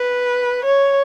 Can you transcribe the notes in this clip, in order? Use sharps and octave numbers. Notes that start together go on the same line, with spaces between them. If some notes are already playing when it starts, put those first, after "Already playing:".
Already playing: B4
C#5